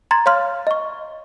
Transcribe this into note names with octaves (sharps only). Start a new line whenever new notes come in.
A#5 C6 G#6 A6
C#5 F5 C6 F6
D#5 C#6